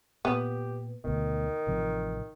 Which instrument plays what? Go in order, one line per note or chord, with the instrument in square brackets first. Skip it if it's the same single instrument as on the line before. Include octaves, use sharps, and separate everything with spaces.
[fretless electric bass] A#2 [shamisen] B3 [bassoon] G4
[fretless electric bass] D2 B2 [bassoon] D#3
[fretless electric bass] A1 C3 F3